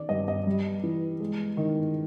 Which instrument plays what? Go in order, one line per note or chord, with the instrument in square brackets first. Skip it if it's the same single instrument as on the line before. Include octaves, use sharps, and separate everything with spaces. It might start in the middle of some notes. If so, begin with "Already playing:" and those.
Already playing: [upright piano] D#3 D5
G2 D#5
D#5
G3
E3
G#3
D#3